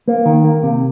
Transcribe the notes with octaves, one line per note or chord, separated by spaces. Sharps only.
A#3
D#3
A#3
C3